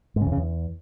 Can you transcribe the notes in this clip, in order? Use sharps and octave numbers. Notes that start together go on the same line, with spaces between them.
G#2
C#3
E2
C#3
E2